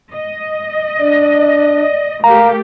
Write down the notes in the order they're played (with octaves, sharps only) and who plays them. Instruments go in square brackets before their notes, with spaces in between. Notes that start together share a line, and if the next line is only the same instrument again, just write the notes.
[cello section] D#5
[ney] D4 [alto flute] D5
[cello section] A3 G4 [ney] A#4 [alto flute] F5 [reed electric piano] A#5